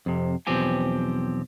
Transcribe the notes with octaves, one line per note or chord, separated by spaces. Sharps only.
F2 C3
B1 E2 F3 C4 G4 G#5